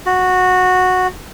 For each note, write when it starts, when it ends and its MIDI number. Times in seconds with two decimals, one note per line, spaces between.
0.06 1.07 66